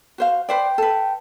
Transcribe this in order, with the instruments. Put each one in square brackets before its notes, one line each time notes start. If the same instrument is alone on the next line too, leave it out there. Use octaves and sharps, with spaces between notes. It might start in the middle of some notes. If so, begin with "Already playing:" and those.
[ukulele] F#4 C5 F5
[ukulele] B4 C5 D5 [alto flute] G5
[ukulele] A4 B4